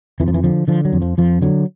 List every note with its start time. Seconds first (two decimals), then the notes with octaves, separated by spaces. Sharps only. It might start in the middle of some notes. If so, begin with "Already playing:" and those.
0.20 F2 E3
0.28 F3
0.34 E3
0.44 D3 F3
0.68 D3 F3
0.85 F#3
0.93 F2
1.02 F3
1.18 F2 F3
1.42 D3 F#3